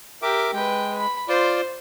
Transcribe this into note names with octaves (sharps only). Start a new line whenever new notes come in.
G4 A#4 E5 D6
G#3 B4 G5
B5
F4 C5 D5